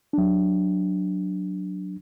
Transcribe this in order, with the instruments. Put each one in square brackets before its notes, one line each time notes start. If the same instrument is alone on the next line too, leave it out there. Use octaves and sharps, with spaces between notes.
[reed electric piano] F#3 D4